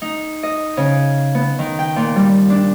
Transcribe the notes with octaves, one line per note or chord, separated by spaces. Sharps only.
D#4
D#5
C#3
B3
D#3
G5
A#2
G3
D4